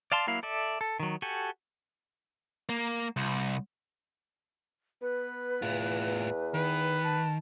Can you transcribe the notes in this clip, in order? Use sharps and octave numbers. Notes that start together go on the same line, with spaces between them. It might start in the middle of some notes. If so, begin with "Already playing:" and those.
D5 F5 A5 C6
F#3 A#3 E4 F5
A4 D5 E5
A4
D#3 F#3
F#4 G4 A4 G#5
A#3
C2
B3 B4
E2 A2 F4
D#3 B4
A5